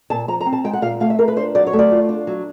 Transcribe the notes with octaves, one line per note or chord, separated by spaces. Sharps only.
A#2 A5
F3 A#5
A#5
C4
A5
G#3 G5
F#5
A#2 F5
A3 F5
E5
F4 A#4
B4
D4 C5
F#3 D5
C#5
A3
D5
F4
D4
F#3